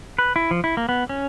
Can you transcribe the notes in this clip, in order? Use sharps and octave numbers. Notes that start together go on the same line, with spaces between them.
B4
E4
F3
E4
A#3
B3
C#4